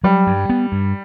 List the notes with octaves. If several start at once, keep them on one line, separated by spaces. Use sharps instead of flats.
F#3 G3
G2
B3
G2